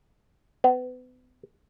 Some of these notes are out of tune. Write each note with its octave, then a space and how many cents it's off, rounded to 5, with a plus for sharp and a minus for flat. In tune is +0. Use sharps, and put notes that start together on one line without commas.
B3 +35